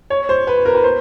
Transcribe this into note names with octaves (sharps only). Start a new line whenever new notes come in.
C#5
C5
B4
A#4
B4
C5